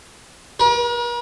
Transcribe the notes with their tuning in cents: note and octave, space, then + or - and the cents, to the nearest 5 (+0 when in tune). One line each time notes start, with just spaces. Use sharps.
A#4 +45